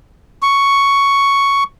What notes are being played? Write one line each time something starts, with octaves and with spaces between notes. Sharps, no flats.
C#6